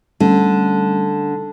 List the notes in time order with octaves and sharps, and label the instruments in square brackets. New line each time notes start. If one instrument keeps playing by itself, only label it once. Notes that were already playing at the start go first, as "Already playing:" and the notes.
[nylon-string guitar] D3 [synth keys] G3 A3 C#4